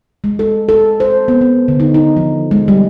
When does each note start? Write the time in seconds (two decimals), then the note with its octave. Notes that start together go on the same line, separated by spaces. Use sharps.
0.24 G#3
0.39 A4
0.69 A4
1.00 C5
1.28 B3
1.41 B3
1.68 D3
1.80 D#4
1.94 D#4
2.17 F3
2.51 G#3
2.68 G3